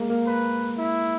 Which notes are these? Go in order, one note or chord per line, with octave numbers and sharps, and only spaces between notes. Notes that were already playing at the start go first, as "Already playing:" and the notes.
Already playing: G#3 A#3
A#3
B4
E4